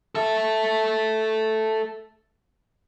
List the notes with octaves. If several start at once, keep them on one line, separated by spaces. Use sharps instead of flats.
A4 E5